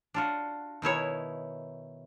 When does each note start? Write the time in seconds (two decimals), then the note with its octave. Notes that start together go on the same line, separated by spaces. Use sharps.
0.14 D4 F4 F#4
0.82 B2 D#3 E4 C#5